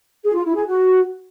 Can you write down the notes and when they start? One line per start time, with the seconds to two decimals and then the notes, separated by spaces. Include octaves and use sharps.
0.24 G#4
0.35 F4
0.45 E4
0.56 G#4
0.66 F#4